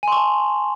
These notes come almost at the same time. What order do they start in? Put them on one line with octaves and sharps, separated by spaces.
G#5 C6 C#6 A5